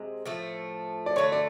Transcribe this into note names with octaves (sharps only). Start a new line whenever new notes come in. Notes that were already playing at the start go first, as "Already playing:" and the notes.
Already playing: C3 G#3
A2 F3 A3
D5
D3 F#3 A3 C#5
D5